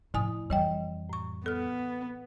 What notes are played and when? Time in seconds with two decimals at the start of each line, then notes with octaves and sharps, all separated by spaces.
0.14 A2 F3 E4 G#5 D#6
0.50 F2 E3 G3 D#5 G5
1.09 A2 C#6
1.46 B3 A4 F6